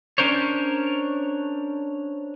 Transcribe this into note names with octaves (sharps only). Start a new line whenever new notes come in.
C#4 D4 A#4 C5 C#5